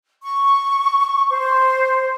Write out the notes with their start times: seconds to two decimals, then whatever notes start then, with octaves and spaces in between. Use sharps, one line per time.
0.23 C#6
1.30 C5